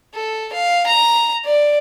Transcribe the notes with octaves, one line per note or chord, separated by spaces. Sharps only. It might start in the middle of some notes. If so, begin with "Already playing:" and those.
A4
F5
A#5
D5